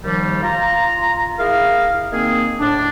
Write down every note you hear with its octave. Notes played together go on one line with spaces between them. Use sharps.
D#2 D#3 F3 G3
F4 A#5
E4 G#4 A#4 F5
D#3 A#3 C4 G#4
A2 D4